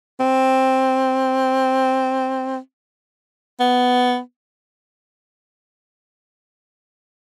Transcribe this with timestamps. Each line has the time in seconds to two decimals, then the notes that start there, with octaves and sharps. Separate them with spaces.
0.20 C4
3.60 B3